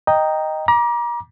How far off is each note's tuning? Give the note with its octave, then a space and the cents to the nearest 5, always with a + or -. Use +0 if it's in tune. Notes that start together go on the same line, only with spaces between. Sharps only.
D#5 +0 G5 +0 A#5 +0
A#5 +35 D6 +0